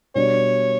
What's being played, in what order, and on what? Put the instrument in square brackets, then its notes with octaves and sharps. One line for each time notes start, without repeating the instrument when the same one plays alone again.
[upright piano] B2 G3 D4 [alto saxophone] C#5